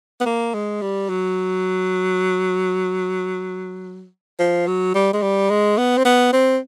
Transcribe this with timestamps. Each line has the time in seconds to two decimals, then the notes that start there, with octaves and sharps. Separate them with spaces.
0.20 B3
0.26 A#3
0.54 G#3
0.81 G3
1.09 F#3
4.39 F3
4.67 F#3
4.94 G3
5.13 G#3
5.22 G3
5.50 G#3
5.78 B3
5.97 C4
6.05 B3
6.33 C4